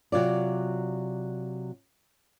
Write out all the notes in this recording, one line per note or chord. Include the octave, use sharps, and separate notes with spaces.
C3 F#3 F4 D5